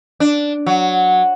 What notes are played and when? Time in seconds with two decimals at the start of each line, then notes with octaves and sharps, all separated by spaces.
0.20 D4
0.66 F#3